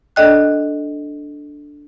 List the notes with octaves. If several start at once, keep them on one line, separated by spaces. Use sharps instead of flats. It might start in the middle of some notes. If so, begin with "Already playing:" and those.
D4 A4 D5 D#5 G5 F#6